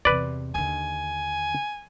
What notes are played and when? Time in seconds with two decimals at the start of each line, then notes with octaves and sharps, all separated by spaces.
0.05 E2 C3 B4 D5
0.55 D#2 D3 G#5